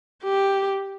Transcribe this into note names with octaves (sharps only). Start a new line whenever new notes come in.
G4